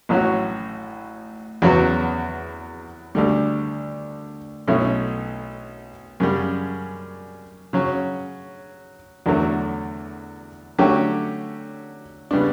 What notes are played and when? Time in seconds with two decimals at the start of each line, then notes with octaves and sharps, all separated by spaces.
0.09 A1 A2 F#3 C#4 F#4
1.62 E2 C#3 F#3 B3 F#4
3.15 D2 D3 G3
4.68 B1 B2 A3 C#4 E4
6.20 F#2 C#3 G3
7.73 C#3 F#3 C#4
9.26 E2 D3 F#3 A3
10.78 D3 F#3 A3 C#4 G4
12.31 C#3 G3 B3 D4